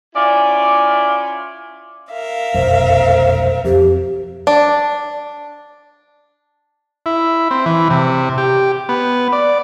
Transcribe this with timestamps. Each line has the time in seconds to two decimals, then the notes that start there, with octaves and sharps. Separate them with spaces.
0.15 C#4 E4 F4 D5
2.11 A#4 E5 F5
2.54 F1 B1 F#2 C5
3.65 F2 G4
4.47 D4
7.06 E4
7.51 C4
7.66 E3
7.90 C3
8.38 G4
8.89 B3
9.33 D5